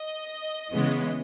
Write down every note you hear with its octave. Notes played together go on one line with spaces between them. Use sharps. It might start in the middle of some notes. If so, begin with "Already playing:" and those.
Already playing: D#5
C#3 E3 G#3 B3